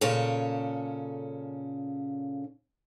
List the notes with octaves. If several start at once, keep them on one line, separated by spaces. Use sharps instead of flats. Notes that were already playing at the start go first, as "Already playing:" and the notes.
A#2 C#3 C#4 A4 C#5